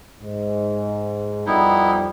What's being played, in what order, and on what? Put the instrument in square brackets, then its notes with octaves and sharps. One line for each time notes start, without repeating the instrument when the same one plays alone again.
[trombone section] G#2
[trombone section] F2 G3 [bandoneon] B3 D#4 E4